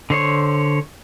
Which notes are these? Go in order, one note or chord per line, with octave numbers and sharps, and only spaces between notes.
D3 C5 C#5